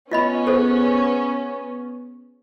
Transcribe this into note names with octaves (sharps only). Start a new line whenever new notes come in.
B3 C#4 F4 D#5 B5
G#4 A4 C5